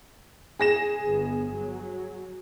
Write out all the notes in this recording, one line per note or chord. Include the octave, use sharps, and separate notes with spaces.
G#4 A#6 E7
G1 B3
F#3